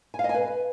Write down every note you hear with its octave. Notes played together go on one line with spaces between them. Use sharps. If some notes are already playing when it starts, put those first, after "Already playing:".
G#5
F5
D#5
G#5
B4